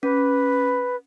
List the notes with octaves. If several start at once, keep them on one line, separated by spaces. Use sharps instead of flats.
C#4 B4